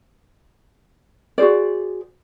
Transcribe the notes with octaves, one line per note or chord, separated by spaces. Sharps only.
F#4 G#4 C5 D5